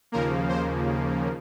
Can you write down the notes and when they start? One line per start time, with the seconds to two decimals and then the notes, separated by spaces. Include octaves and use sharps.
0.12 D#2 C#3 F3 A#3 A#4
0.49 C5